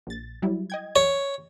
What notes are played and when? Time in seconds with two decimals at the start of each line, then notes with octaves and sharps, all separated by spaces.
0.07 A#1 A6
0.42 F#3 G3 E4
0.70 D#5 G5 G#6
0.96 C#5